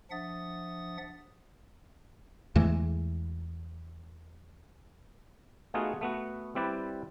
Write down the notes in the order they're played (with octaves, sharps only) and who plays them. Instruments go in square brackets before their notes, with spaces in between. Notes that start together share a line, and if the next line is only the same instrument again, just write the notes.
[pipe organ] F3 D4 E5 F#5 D#6 A6
[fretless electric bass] E2 E3 G#3 A3
[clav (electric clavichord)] A3 B3 D#4 F4 F#4 G#4
A3 B3 F#4
G3 C4 E4 G4 B4 D5